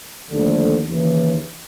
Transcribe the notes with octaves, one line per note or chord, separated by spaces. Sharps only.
D#2 D3 F3 A3 D4
D#2 C#3 E3